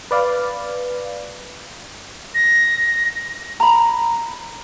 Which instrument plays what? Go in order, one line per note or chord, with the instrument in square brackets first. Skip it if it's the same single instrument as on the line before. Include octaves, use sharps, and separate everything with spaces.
[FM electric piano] B4 D5 F5
[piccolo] A#6
[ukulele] A#5 B5